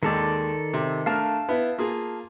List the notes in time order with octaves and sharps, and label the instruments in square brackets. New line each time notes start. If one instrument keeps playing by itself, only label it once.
[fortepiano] D#2 G#3 [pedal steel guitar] D#3 A4 D5
[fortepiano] C3
[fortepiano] A3 D4 A#4 [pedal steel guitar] F5 A5 F6
[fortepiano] B3 E4
A#3 F4 G#4